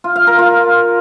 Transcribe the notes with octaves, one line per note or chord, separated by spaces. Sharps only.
F4
F5
A#4
F4